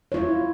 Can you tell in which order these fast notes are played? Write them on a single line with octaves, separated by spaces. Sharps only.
C#5 F4 E4